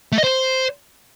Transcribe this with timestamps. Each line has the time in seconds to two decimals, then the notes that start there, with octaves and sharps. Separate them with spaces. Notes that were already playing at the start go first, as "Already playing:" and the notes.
0.12 A3
0.18 D#5
0.24 C5